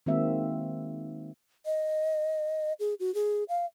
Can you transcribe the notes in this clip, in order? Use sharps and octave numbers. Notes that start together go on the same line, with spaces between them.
D#3 G#3 A#3 C4 F#4 E5
D#5
G#4
F#4
G#4
F5